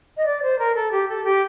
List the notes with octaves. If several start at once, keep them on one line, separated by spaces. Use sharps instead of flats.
D#5
D5
C5
A#4
A4
G4
A4
G4